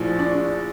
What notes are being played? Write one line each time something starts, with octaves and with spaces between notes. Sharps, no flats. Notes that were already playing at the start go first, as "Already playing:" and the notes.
Already playing: A#1 A2 F3
D4